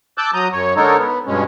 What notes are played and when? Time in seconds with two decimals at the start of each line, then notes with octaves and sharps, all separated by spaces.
0.18 A5 D6 E6 F#6 G6
0.34 F#3 A#5 D#6 G6
0.53 F#2 C#5
0.76 D3 G#3 D#4 A4 A#4 C#5
0.97 B3
1.27 G2 B2 G#3 C#4